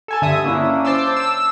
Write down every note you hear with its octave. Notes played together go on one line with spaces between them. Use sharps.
A4 G#5 A5
G2 D3 E5 D#6
A#3 C#4 D4 E4
C5 A5 C6 D6 E6
E6 E7